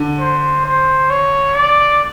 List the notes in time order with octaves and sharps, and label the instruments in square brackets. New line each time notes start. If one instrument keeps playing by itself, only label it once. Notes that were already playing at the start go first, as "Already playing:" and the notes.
Already playing: [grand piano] D3
[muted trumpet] C5
C5
C#5
D5